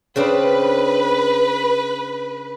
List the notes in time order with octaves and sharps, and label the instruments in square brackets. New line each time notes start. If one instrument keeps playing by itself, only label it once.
[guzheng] C#3 C4 D4 [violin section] B4